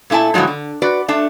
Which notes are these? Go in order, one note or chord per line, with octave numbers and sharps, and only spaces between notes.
A#2 A3 E4 G#5 A5
A2 D3 F3 F#3 G#3
D3
F#4 B4 D5
A3 D4 A5